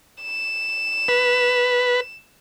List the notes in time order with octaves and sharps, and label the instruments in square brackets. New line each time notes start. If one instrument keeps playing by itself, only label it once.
[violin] E7
[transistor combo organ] B4